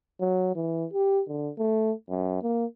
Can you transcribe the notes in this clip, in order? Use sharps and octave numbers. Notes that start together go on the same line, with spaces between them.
F#3
E3
G4
D3
A3
F#2
A#3